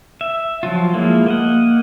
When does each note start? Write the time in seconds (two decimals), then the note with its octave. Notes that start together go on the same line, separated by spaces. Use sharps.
0.21 E5
0.63 F3 F#3 F4
0.94 F3 G#3 A#3 E4
1.26 A#3 D#5 F#5